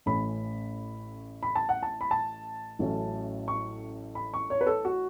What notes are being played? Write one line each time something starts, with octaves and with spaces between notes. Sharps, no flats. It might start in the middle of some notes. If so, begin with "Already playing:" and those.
A1 A2 E3 A3 C#4 B5
B5
A5
F#5
A5
B5
A5
A1 A2 F#3 C#4 E4
C#6
B5
C#6
C#5
B4
A4
F#4